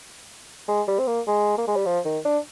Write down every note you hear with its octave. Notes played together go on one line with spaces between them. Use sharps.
G#3
G3
C4
A#3
G#3
A#3
G#3
G3
F3
D#3
D4